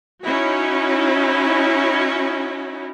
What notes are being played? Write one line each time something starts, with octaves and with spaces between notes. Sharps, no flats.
C#4 D#4 E4 F#4